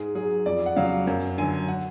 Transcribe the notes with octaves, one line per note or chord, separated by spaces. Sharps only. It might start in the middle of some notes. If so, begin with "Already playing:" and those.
Already playing: G#2 G#4
F#3 G#4
F2 D5
F#5
C#3 F#3 F5
F#2
D3 F#3 G#5
F#5